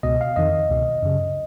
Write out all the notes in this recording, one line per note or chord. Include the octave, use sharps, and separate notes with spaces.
C#2 B2 D#5
F5
F2 D#3 D#5
C#2 B2
F#2 C#3